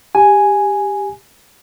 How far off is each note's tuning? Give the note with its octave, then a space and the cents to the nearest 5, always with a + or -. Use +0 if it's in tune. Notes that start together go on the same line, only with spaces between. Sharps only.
G4 +10 G#5 +0